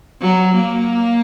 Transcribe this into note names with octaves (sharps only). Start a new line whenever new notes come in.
F#3
A#3